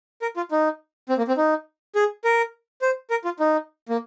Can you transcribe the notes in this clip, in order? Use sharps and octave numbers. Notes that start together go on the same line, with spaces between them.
A#4
F4
D#4
C4
A#3
C4
D#4
G#4
A#4
C5
A#4
F4
D#4
A#3